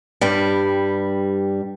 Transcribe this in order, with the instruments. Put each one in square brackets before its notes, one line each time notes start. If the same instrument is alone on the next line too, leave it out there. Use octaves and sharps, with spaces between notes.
[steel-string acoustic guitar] G2 G3